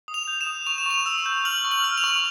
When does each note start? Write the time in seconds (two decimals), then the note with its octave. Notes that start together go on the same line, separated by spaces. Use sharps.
0.08 D#6
0.14 F7
0.28 G6
0.41 E7
0.47 D#6
0.66 C#6 F7
0.78 E7
0.86 C#6 F7
1.06 E6
1.26 G6
1.45 F6 F#7
1.65 C#6
1.71 F#7
1.84 F6
1.97 F7
2.04 C#6